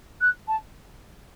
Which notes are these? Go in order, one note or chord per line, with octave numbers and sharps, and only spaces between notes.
F#6
A5